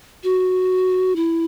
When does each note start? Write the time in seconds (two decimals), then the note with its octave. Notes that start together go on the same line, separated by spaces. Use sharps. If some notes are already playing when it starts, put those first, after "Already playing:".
0.24 F#4
1.16 E4